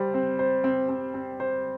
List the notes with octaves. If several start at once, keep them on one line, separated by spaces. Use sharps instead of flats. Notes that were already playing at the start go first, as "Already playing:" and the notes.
Already playing: G3 C5
C4
C5
C4
C4
C4
C5